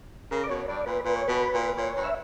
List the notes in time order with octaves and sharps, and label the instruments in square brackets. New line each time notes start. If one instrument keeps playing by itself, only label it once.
[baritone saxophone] C#3 [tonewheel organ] A#4
[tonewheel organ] D5
[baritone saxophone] B2 [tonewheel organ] C#5
[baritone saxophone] G2 [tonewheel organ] D5
[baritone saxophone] A#2 [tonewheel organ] B4
[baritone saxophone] A#2 [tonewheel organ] B4
[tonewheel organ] C#5
[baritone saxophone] B2 [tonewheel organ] B4
[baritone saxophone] A#2
[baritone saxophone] A#2 [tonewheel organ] C#5
[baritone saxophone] G2
[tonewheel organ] E5